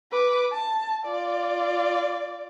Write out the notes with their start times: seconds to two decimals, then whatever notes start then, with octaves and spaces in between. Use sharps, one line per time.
0.11 B4 D6
0.52 A5
1.06 F4 D5